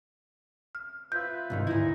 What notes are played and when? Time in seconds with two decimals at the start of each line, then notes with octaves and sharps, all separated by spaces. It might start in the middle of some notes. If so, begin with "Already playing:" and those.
0.75 F6
1.12 F4 B4 E5 G6
1.50 C2 G#2 D#3
1.67 D2 A#2 D#4 E4